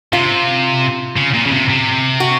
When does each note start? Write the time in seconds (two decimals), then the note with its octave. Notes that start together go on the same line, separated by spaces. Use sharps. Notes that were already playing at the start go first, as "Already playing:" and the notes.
0.13 C3 F4
1.17 C#3
1.34 A#2
1.46 C#3
1.52 C3
1.68 C3
2.20 F#4